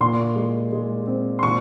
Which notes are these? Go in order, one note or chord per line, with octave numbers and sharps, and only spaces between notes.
A#2 C6
G#3
G#3
C4
C6
A#2 C#6